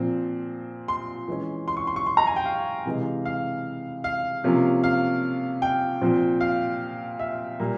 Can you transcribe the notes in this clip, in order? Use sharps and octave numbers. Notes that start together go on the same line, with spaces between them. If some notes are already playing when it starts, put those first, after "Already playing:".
Already playing: A#2 F3 C4
C6
E3 G#3 C#4
C6
C#6
C6
C#6
C6
A#5
G#5
G5
F5
C3 E3 G#3
F5
F5
C3 F3 A#3 C#4
F5
G5
A#2 F3 C4
F5
E5
A#2 G3 A#3